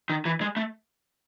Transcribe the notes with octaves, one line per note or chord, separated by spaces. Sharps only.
D#3
E3
G#3
A3